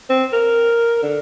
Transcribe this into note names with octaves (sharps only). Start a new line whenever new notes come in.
C4
A#4
D3